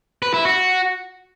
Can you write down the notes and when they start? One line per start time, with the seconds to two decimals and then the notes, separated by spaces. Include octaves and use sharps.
0.22 B4
0.34 E4
0.45 F#4